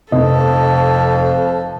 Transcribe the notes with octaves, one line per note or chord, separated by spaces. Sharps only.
F1 F2 A4 D#5